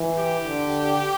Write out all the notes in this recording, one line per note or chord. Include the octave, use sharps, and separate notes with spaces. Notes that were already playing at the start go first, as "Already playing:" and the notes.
Already playing: E3
G4
D3